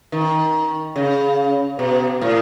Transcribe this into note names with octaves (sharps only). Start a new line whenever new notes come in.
D#3
C#3
B2
A2